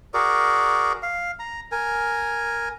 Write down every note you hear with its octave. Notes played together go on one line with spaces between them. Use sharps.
F#4 G#4 A#4 D5
F5
A#5
A#4 G#5